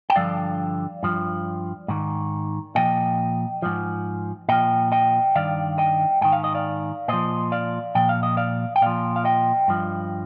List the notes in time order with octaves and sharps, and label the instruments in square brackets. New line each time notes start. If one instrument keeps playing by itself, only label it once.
[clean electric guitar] G5
G2 D3 F3 D5 F5
G2 F3
G#2 D#3
A#2 F3 D#5 G5
G#2 F3
A#2 F3 D#5 G5
D#5 G5
G2 D#3 D5 F5
D#5 G5
G#2 D#3 G5
F5
D#5
D5 F5
A#2 F3 C5 D#5
D5 F5
A#2 F3 G5
F5
D#5
D5 F5
G5
A#2 F3 D5 F5
F5
D#5 G5
G2 F3